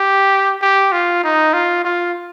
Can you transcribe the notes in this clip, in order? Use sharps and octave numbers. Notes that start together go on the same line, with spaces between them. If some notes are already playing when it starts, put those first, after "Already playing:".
Already playing: G4
G4
F4
D#4
F4
F4